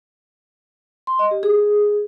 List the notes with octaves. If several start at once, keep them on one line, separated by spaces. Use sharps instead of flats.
C6
D#5
G4
G#4